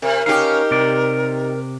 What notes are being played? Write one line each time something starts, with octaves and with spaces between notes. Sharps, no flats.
C3 A#4
C#4 D#4 G4 F5
C3 D5